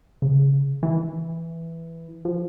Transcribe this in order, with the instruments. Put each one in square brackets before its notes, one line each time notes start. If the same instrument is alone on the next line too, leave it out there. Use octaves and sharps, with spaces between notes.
[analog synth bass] C#3
E3
F3